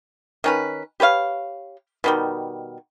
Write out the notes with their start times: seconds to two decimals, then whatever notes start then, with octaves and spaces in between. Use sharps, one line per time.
0.44 D#3 C#4 B4
1.00 G4 B4 C#5 F5
2.04 B2 D#3 G3